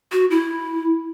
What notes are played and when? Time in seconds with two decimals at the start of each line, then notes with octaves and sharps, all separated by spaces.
0.12 F#4
0.30 E4